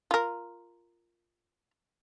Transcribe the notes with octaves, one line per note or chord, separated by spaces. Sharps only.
F4 A#4